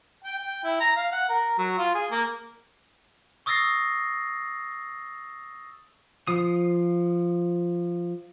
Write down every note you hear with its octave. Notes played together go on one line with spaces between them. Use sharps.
G5
G5
E4
A#5
F5
F#5
A#4
F#3
F4
G#4
A#3
C#6 D#6 E6 A6 A#6 C7
F3 D#6